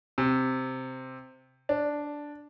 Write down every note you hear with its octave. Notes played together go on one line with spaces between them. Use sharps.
C3
D4